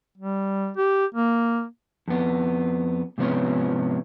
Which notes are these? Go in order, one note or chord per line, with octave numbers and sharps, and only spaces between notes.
G3
G4
A#3
F2 B3
G#2 C3 F3 B3 C#4